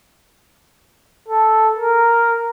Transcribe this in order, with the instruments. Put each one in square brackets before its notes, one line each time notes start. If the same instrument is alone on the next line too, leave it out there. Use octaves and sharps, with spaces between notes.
[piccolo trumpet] A4
A#4